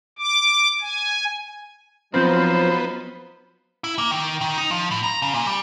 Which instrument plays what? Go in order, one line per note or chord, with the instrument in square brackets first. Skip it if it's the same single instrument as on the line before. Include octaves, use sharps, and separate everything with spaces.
[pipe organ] D6
G#5
[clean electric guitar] F3 C4 [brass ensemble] F#3 [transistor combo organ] B3 [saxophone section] D#4 F4 C5
[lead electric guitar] E4
A#3
D#3
D#3
D#4
F3
A2
A#5
C#3
A#2
G3